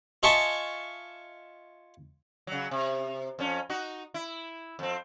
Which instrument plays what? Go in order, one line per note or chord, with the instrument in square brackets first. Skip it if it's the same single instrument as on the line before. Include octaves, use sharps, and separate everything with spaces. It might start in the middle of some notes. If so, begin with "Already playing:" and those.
[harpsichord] F4 D#5 E5 G#5 A5 C#6
[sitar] C#3 F#3
C3
F2 C#4
D#4 F#4
E4
F2 C4